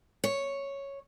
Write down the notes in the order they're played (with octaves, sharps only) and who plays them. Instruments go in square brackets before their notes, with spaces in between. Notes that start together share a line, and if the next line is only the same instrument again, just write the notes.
[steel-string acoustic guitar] C#5